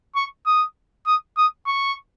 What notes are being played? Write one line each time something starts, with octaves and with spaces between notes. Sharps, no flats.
C#6
D#6
D#6
D#6
C#6